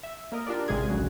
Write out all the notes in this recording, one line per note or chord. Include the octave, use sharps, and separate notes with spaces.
E5
A#3 A#4 D#5
D4 F4 G4 A#4 D5
A1 C3 G#3 G#4 G#6
A1 D2 C#3 F#3 F#4